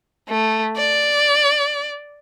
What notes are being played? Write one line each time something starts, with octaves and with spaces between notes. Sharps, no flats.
A3
D5